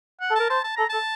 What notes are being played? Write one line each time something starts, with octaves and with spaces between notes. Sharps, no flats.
F#5
A4
A#4 A5
C5 A5
A5
A4 A#5
A4 A5